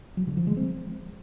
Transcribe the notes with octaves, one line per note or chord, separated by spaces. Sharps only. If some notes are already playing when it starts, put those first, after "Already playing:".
F#3
D3
F3
G#3
C4